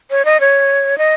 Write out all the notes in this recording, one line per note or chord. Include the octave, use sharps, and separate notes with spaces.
C#5
D#5
C#5
D#5